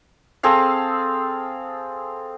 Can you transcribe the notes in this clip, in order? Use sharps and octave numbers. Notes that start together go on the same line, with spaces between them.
C4 G#4 A4 F5